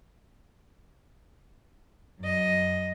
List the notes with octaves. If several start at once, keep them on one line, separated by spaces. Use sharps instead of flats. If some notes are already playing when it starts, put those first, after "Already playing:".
F#2 D#5